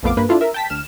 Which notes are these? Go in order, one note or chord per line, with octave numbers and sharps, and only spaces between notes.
A#1 F2 A3 B3 F5 D6
G2 A#3 B4
D4 E4 F4 A4
A#4 E5
G5 A5 B6
D2 F6 E7